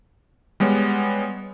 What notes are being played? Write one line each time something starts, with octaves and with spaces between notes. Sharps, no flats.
G3 G#3 B3 C#5